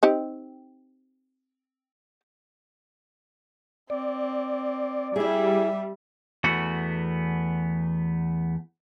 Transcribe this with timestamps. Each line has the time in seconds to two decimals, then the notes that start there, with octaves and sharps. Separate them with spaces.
0.03 C4 D#4 G4
3.90 C4 D5
5.16 G3 E4 G#4 E5
6.44 E2 A3 B3 F#4